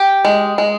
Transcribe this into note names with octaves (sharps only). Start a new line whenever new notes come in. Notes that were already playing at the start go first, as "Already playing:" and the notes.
Already playing: G4
G#3
G#3